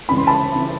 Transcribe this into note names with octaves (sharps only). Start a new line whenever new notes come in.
C#2 C#3 E3 B5
C6
A5 B5
C#3 E3